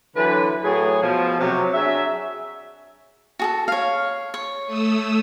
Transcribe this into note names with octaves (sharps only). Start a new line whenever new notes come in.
D3 E3 F#3 B4
A2 F#3 A3 G#4
B2 F3
C3 F#3
F#3 D4 G#4 E5
F#4 G#4 A4
C#5 F5
C#5
A3 D#6 E6